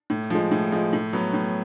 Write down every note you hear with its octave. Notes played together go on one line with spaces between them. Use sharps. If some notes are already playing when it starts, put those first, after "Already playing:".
A2
F3 G#3
A2
F3 G#3
A2
F#3 B3
A2